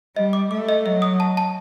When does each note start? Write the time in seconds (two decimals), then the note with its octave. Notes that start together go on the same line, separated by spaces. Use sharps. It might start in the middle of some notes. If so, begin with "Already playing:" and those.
0.16 G3 D#5
0.33 D6
0.51 A3 D6
0.69 D#5
0.86 F#3 D#5
1.02 D#6
1.20 A5
1.37 A5